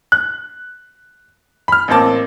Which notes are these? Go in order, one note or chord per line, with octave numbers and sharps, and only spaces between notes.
F#6
B5 F6
A1 A#3 C4 A5 D6